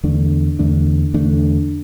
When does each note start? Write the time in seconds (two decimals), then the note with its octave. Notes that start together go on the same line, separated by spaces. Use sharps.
0.03 E2 D3 A3 D4
0.59 E2 D3 A3 D4
1.14 E2 D3 A3 D4